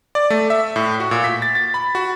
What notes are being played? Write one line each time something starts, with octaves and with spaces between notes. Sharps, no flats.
D5
A3
E5
A2
F#4
A#2
B6
A6
A6
B5
F#4